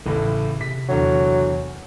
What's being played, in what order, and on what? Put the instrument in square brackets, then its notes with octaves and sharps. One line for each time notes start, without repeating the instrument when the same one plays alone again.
[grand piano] A1 A2 [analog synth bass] C#3
[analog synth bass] C3 [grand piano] B6
[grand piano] E2 D3 [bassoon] F#3